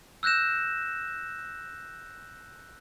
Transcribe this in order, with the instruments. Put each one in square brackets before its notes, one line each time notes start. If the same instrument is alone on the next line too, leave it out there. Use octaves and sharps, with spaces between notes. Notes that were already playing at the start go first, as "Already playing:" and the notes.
[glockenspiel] E6 F#6 G6 A#6 E7